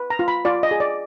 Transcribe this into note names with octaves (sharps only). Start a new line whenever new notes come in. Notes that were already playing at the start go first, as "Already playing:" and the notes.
Already playing: B4
A#5
F4
B5
F4 D5
D#5
G#4
D5